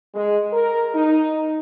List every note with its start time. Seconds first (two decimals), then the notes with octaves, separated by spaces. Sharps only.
0.15 G#3
0.53 A#4
0.94 D#4